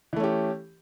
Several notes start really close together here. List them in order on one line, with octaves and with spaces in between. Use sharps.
E3 A3 C#4 G4